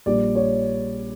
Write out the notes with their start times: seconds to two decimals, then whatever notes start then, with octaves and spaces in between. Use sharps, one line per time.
0.06 A#1 A#2 G3 D5
0.35 C#5